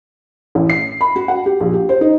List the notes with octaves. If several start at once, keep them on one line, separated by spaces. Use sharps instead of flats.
A1
C7
B5
F#4
F#5
G4
A#1
G4
C5
D#4